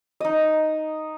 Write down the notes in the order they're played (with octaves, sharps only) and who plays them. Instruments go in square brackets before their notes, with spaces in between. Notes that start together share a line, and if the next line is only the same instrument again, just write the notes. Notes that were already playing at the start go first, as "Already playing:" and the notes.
[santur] D#4 D#5